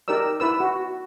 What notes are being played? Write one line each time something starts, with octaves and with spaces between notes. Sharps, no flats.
D#4 G4 A#4 D5 E6
E4 B4 E6
F#4